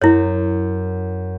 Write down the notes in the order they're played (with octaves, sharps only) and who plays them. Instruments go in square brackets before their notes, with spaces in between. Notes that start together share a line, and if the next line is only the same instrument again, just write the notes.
[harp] F#2 [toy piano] E4 C#5